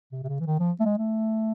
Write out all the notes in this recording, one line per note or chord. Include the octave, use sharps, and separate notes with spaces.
C3
C3
C#3
E3
D#3
F3
A3
G#3
A3